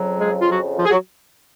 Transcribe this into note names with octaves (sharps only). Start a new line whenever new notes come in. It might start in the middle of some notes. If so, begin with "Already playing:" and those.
Already playing: F2 C#3 F#3
G#3 G#4
F4
F#3 F#4
F3 F4
G#4
F#3 F#4